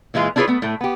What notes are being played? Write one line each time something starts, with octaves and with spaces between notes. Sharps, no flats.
A#2 E3 G#3 F4 G#4
D4 E4 F4 G#4 B4 C#5
A3 B3
A2 A3
B3 G4